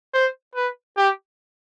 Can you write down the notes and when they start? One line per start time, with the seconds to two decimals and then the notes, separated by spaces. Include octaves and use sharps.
0.14 C5
0.55 B4
0.97 G4